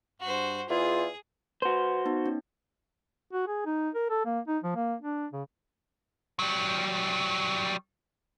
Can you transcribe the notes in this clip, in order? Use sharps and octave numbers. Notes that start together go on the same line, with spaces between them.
G2 F#4 C5
E2 F4 G#4
F#4 B4 C5
B3 D#4
C#4
F#4
G#4
D#4
A#4
A4
A#3
D#4
F3
A#3
D4
C#3
F#3 G3